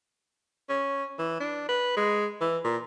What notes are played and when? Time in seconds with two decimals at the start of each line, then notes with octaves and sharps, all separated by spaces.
0.69 C#4
1.19 E3
1.40 D4
1.69 B4
1.97 G#3
2.41 E3
2.64 A#2